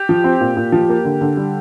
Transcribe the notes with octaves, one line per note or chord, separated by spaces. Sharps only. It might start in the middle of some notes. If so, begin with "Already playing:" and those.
Already playing: G4
F3
C4
A#2
A#2
F3
A#3
D3
D3
G3